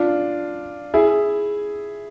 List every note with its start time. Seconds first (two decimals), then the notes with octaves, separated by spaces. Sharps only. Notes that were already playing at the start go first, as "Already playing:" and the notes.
Already playing: D4 F4
0.94 E4 G#4